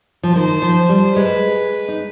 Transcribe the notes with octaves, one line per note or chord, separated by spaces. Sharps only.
F3
D#3 C5
F3
G3
G#3 B4
D#4